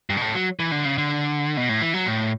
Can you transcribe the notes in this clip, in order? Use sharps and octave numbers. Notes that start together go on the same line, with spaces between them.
G2
B2
A2
F#3
E3
D3
C#3
D3
B2
A2
E3
F#3
A2